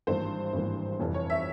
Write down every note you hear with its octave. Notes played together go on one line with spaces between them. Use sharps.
G#1 G2 E3 A#3 C5
G#1 G2 E3 A#3
F1 F2 E3 G3
C#5
E5